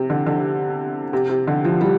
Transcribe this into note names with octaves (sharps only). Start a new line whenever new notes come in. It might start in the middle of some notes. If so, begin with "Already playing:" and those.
Already playing: C3
D3
D3
C3
C3
D3
F3
G3